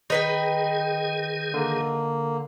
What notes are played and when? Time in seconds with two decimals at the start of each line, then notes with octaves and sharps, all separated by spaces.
0.10 D#3 D#4 G#4 B4 G5
1.54 D3 A#3